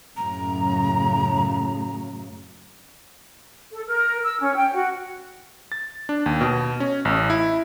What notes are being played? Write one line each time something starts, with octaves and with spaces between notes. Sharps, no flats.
F#2 A2 C#3 A#5
A4
A#4
E6
C#4
G5
F#4
A6
D4
D#2
B2
C#4
A1
E4